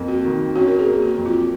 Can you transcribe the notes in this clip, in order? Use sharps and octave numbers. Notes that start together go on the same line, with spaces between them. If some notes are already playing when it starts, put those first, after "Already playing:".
Already playing: F2 A#3
F#4
D#3
C#4 F#4
A#4
G#4
A#3
F#4
F2
F4